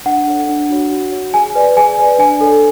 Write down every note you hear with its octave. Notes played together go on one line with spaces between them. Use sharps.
D4 F#5
A4 C#5
D4
F#4 C#5
F#4
C#5
G#4 G#5
B4 D5
G#4 G#5
B4 D5
D4 G#5
A4 C#5